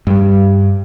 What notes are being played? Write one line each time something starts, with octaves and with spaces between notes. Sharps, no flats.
G2 G3